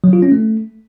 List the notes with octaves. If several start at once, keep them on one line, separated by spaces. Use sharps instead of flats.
F#3
F4
C#4
A3